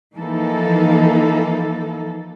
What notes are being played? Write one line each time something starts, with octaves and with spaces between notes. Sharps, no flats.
E3 F3 A#3 D#4 A4